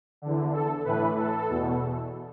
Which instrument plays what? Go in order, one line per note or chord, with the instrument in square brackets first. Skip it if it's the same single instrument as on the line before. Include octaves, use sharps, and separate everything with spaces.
[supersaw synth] E2 D3
A4
A2 E3 B4
A4
E2 B2